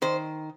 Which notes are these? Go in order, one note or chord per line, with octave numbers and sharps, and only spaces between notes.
D#3 C5